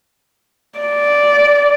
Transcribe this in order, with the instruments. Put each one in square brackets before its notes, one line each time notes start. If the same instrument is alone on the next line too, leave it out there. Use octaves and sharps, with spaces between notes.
[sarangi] D5